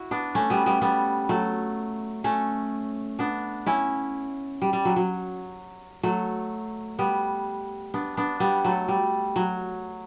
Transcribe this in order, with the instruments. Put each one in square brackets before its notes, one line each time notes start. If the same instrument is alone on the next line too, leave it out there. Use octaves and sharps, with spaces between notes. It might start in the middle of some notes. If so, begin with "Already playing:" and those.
Already playing: [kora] E4 F#4
B3 D4
A3 C#4
G3 B3
G3 B3
G3 B3
F#3 A3
A3 C#4
B3 D4
C#4 E4
G3
G3
F#3
F#3
F#3 A3
G3 B3
B3 D4
B3 D4
G3 B3
F#3 A3
G3
F#3